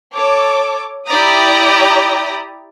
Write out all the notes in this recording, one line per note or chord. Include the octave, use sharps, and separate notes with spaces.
A4 C#5 D6
E4 G4 D5 A#5 D#6